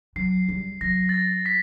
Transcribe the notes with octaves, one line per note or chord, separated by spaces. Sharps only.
F#3 C7
G3
F#3 A#6
A6
A#6
B6